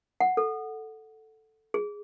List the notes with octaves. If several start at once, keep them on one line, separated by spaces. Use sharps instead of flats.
F#5
A4
G#4